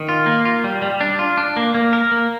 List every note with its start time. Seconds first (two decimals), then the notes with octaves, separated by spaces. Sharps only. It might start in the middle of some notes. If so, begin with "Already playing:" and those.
Already playing: D#3
0.09 F4
0.26 A#3
0.45 F4
0.64 G3
0.82 G3
1.01 D4
1.19 F4
1.37 D4
1.57 A#3
1.75 A#3
1.93 A#4
2.12 A#3